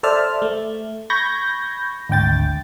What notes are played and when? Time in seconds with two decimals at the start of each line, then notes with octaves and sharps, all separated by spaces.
0.03 A4 C5 D5 E5 A5 F6
0.42 A3
1.10 B5 C#6 G6 G#6 A#6
2.09 G#1 D2 G5 A6